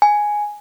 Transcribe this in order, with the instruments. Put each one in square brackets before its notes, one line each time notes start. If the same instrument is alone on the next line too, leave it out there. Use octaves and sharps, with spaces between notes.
[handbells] G#5